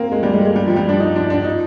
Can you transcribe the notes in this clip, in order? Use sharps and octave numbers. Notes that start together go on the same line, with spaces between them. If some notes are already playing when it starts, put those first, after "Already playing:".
Already playing: A#3 C4
G#3
G3
G#3
G#3
G3
F3
G3
D4
D#4
D4
D4
D#4